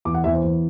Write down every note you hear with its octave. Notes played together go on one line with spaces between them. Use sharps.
E2 D6
F#5
E2 E5
C5
E2